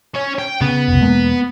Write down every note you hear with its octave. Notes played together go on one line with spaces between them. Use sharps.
C#4 C#5
G5
C#3 B3
F1 C2
E1 G#3 A#3